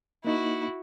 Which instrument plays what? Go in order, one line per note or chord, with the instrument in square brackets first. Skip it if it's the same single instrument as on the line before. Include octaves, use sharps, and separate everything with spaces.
[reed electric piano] A#3 D#4 [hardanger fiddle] E4 F#4